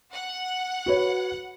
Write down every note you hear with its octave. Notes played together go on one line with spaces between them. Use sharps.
F#5
F#4 B4 C#5